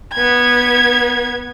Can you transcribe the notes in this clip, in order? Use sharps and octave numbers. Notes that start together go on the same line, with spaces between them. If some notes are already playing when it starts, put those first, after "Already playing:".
B3 G#6